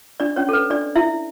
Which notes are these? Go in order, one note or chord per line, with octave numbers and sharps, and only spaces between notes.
D4 D5
C#4 C#5
A4
B4
D4 D5
E4 E5